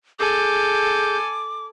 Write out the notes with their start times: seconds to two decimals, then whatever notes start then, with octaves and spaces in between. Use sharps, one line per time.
0.19 G#4 A4 G#5 D6 G6